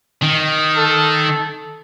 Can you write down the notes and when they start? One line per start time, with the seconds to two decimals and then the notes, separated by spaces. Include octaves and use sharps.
0.22 D#3
0.77 A4